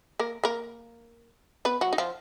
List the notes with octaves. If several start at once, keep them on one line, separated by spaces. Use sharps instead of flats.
A#3 A#4
A#3 A#4
B3 B4
F#3 F#4
D#4
F3 F4